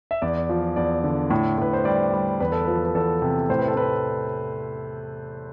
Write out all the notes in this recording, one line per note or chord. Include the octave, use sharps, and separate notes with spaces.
E5
E2 D5
F3
E2 D5
D3
A2
A2 B4
C5
G3 D5
G3
E2 B4
A4
F3 B4
B4
E2 A4
C3
A2 C5
B4
A4
A2 B4